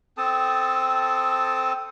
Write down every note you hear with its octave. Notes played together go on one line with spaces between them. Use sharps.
C4 A4 A5 D#6